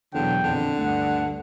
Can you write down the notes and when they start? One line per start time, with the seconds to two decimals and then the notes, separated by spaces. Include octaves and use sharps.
0.14 E2 B2 D3 F#3 G5
0.44 A#1 F2 D3
0.78 D2 G2 A3 F#5